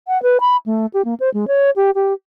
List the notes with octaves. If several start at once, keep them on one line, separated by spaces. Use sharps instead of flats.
F#5
B4
B5
A3
G4
A#3
C5
G#3
C#5
G4
G4